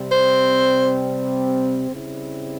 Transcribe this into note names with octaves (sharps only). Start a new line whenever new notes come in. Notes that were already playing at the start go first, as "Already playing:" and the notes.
Already playing: C3 G3 C4
C5
C#3 G3 C4 E4